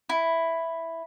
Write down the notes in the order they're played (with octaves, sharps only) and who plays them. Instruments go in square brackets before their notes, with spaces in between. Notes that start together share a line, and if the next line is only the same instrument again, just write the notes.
[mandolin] E4